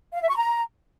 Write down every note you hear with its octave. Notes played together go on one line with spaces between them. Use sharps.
F5
E5
C#6
A#5